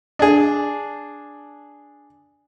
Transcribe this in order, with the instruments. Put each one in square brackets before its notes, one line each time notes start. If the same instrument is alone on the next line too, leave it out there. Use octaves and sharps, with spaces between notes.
[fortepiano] D4 G#4